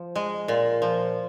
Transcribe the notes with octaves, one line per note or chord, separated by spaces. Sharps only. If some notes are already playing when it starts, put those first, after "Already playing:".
Already playing: F3
G#3
A#2
F3